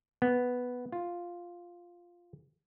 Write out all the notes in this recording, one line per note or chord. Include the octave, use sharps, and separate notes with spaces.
B3
F4